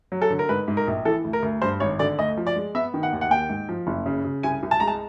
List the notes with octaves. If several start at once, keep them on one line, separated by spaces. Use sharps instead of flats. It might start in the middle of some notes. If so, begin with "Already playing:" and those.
F#3
A4
D3
A#4
G#2 B4
G#2
A#4
A#1
E3 A4
D2
A#4
D2
G2 C5
G#1 C#5
D3 D5
D2 D#5
F3
D5
G#3
B3 E5
D#3
F#5
D#2
F#5
A#3 G5
G#2
F3
F#1
C#3
C#3
C2 G#5
C2
A5
G#3 A#5
A5